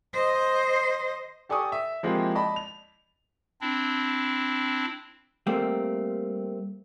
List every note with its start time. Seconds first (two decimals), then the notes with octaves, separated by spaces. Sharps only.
0.13 C5 D#5
1.49 G4 A4 D5 G#5 C#6 D#6
1.72 E5
2.03 F3 G#3 A#3 C4 E4 G4
2.35 D5 D#5 A5 B5
2.56 F7
3.61 C4 D4 E4
5.47 G3 A3 A#3 C4